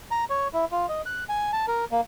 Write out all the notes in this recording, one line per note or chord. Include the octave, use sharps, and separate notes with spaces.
A#5
C#5
E4
F4
D#5
F#6
G#5
A5
A#4
A#3